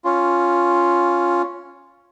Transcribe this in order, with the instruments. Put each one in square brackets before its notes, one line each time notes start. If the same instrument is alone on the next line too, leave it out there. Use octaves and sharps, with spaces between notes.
[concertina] C#4 F4